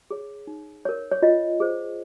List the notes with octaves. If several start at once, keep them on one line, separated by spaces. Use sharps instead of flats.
G#4 C#5
D#4
A#4 C#5
C#5
F4 D#5
G#4 C5